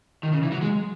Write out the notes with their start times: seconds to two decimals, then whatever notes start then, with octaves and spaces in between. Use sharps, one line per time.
0.23 D#3
0.33 C#3
0.43 E3
0.52 F#3
0.62 G#3